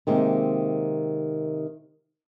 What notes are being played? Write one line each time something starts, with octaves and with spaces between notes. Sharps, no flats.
C3 D#3 G#3 A#3 C4